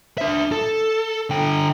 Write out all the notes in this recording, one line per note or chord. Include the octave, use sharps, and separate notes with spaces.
D4 E5
A4
D3 G5